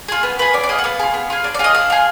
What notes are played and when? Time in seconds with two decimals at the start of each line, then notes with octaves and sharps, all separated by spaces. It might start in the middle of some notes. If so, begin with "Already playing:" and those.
0.08 F4 G#4
0.23 B3
0.39 F4 G#4 B4
0.53 B3 D5
0.63 D5
0.69 F4 G#4 D#5
0.79 F#5
0.84 B3 F5
0.99 F4 G#4
1.14 B3
1.30 F4 G#4
1.44 D4
1.54 D5
1.59 F4 G#4 D#5
1.74 D4 F5
1.90 F4 G#4